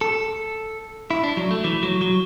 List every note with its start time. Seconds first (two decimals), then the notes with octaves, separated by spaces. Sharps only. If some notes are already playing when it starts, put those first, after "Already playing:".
0.01 A4
1.11 E4
1.23 D4
1.37 F#3
1.51 A3
1.64 E3
1.83 F#3
2.01 F#3